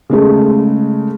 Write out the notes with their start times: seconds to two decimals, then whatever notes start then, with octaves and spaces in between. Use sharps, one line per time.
0.10 C#3 G#3 A3